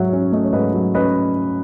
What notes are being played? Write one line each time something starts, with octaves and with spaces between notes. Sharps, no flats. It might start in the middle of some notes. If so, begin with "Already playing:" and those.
Already playing: G#2 F#3 C#5 E5 F#5
C#4
A3 D#5
C#5
G#2 B4 D#5
F#3
C#4 B4 D#5